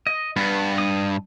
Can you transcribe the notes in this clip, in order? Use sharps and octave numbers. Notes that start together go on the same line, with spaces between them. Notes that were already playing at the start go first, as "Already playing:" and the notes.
D#5
G2 B3
D#6